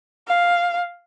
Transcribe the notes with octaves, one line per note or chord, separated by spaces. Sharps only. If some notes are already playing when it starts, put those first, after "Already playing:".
F5